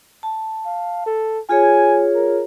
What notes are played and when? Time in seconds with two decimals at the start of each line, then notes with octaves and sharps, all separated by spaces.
0.23 A5
0.66 F5
1.06 A4
1.49 F4 G#4 C#5 G#5
2.15 A#4